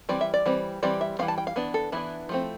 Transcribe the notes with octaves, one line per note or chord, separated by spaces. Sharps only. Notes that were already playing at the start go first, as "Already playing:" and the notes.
E3 G3 C4 D5
E5
D5
E3 G3 C4
E3 G3 C4 D5
E5
E3 G3 C4 F5
A5
G5
F5
E3 B3 D4
A4
E3 B3 D4 E4
F3 A3 C4